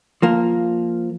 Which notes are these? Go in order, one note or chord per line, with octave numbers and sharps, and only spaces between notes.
F3 A#3